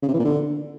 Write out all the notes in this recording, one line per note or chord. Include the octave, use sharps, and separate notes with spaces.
C#3
C3
E3
A#2
D3